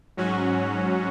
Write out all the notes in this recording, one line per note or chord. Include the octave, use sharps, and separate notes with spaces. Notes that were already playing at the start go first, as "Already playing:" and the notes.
G#2 F#3 C#4 F#4